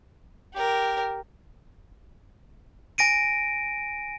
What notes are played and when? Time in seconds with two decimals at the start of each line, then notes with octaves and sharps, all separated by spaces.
0.54 G4 A#4
2.98 G#5 A#6 D7 D#7